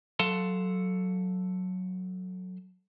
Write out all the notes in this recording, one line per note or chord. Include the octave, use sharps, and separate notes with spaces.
F#3 A4 F5 F#5 C6